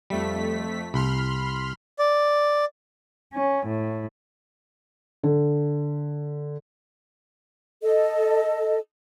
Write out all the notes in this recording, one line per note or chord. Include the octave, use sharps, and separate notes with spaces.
F2 G3 A3 B6
C2 B5 C6 F6
D5
C#4
A2
D3
A4 D#5